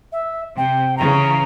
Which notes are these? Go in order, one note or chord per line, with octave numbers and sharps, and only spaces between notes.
E5
C3 G5
C#3 E3 A#5